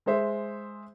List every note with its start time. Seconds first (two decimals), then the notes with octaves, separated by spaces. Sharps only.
0.06 G#3 G#4 C5 E5